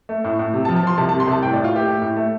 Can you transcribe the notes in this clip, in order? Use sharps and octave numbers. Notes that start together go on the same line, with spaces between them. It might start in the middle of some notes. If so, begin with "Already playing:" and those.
A3
A2
A2
C3
A5
F3
A5
F3 C6
C2 A5
A5
C3
C6
C2 A5
A2 G5
D5
A2
F4
A3 G4
A3
A2
A3